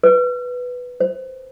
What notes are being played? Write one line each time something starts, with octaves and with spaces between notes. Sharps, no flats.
B4
C5